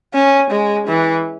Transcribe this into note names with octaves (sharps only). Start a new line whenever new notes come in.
C#4
G#3
E3